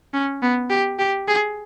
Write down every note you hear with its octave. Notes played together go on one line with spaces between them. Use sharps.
C#4
B3
G4
G4
G#4